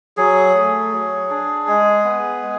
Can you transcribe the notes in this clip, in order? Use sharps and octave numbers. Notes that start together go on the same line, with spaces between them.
F#3 G#4
A3
F#3
D4
G#3
B3
G#3